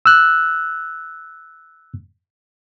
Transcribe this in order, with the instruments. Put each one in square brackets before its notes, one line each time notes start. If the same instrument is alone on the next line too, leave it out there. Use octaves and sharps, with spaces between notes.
[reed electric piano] E6 F#6